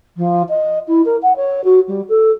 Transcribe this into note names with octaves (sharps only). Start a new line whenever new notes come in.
F3
D#5
E4
A#4
F#5
C#5
F#4
G3
A4